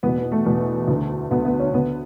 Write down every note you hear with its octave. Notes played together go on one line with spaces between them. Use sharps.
E2 B2 B3
B3
A3
E2 B2
D2 D3
D2 D3 B3
B3
C#4
D2 D3 B3